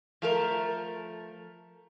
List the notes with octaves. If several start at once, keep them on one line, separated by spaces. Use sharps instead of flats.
F3 A3 A#4